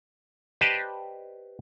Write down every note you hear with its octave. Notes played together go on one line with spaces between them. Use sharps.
G4 B4 C5 D5 D#5 A5